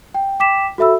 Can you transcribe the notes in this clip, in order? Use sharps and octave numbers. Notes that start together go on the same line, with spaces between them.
G5
G5 D6 B6 E7
F#4 A4 E5 B5 E6